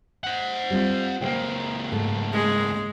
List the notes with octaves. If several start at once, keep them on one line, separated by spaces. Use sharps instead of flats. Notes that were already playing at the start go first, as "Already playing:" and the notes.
C5 F#5
G3 C4 F4
C#2 A#3 C5 G5
G#2 A3
G#3